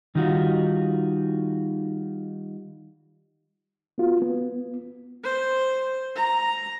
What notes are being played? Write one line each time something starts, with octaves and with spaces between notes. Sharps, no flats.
D#3 G3 D#4 F4 F#4
B3 F4 F#4
B3
C5
A#5